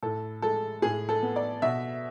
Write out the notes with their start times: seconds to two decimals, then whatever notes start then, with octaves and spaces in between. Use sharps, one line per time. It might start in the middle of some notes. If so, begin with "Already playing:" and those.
0.03 A2 A4
0.42 G#3 A4
0.82 A2 G#4
1.09 A4
1.23 B3
1.36 D5
1.62 B2 E5